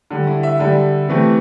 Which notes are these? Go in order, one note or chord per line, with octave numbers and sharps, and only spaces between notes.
D3 G3
E4
E5
D3 G3
C3 E3 A3